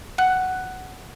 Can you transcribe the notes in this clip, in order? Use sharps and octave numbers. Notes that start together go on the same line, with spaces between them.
F#5 F#6